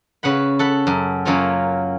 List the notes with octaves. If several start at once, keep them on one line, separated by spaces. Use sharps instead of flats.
C#3 B4 F#5 B5
A4 F#5 B5
F#2
F#2 F#3 A#3 C#4 F4